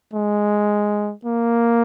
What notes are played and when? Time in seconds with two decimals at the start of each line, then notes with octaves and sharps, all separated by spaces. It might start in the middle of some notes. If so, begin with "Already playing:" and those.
0.14 G#3
1.25 A#3